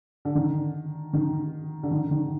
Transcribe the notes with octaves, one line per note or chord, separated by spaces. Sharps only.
D3
D#3
D#3
D3
D#3
D#3